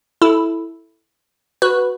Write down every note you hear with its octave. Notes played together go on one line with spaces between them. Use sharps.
E4 A4
F#4 B4